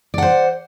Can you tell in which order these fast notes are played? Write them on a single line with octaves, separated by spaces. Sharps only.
D5 F#5 C5